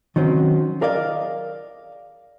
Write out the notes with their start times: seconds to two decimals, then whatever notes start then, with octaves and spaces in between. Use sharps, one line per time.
0.16 D#3 F#3 C4 C#4
0.81 G#4 A#4 D5 D#5 F5